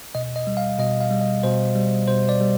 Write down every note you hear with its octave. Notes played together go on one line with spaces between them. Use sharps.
B2 D#5
D#5
G3
F5
B2 D#5
F5
G3
D#5
B2 C5
G3
B2 C5
D5
G3